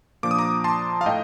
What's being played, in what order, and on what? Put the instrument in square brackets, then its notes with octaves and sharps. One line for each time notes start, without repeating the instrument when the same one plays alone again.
[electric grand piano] A#2 F3 A#3 D4 D6
D#6
A#5 D6
A5 C6
F5
A2 A3 D#5 G5